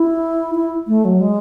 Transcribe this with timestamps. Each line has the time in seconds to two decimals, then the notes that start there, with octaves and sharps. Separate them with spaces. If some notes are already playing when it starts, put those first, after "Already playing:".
Already playing: E4
0.55 E4
0.88 A3
1.05 F#3
1.21 G#3